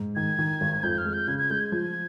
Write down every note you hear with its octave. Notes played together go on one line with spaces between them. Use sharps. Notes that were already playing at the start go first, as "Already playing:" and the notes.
Already playing: G#2
D#3 G#6
D#3
G#1
F2 G6
F6
G#3
G6
C#3 G#6
G#6
G#3 G6
G#6
F3